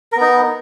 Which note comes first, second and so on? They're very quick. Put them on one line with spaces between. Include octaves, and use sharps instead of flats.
A#4 B3 D#4